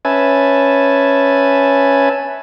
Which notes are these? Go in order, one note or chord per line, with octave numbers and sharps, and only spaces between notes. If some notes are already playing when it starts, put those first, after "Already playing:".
C#4 B4 E5 G#5 A5